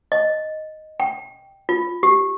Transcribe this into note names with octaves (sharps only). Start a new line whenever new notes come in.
D#5
G5
F4
G4